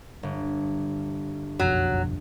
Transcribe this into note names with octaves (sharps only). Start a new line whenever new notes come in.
G1
F#1 B1 F2 F#3